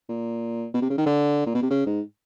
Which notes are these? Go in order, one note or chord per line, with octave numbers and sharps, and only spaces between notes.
A#2
B2
C3
C#3
D#3
D3
A#2
B2
C3
C#3
G#2